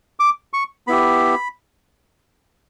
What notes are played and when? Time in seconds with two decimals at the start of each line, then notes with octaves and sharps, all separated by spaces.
0.20 D6
0.53 C#6
0.87 B3 E4 G4 B5